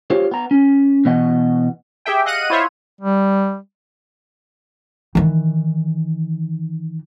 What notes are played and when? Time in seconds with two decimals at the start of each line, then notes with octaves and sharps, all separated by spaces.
0.10 F4 G4 C5 C#5
0.31 B3 A#5
0.51 C#4
1.05 B2 E3 B3 D#5 F#5
2.05 G4 G#4 E5 G5
2.26 D#5 F5 F#5 F#6 D#7
2.50 E4 F4 C5 C#5 E5
3.01 G3
5.15 D#3 E3